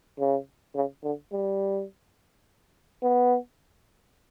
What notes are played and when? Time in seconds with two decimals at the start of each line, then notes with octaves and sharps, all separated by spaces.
0.19 C#3
0.75 C#3
1.03 D3
1.32 G3
3.03 B3